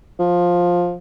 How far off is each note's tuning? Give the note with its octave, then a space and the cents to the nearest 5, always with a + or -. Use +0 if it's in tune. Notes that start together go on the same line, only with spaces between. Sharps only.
F3 +10